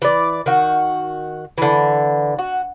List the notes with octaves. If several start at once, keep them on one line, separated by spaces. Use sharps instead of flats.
E3 D5
D#3 F#4
D3 E3
F#4